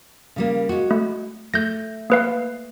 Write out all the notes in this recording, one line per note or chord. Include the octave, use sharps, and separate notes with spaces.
C#3 G3 A#3
G#3 F#4
A3
A3 G6 A#6
A#3 B4 F5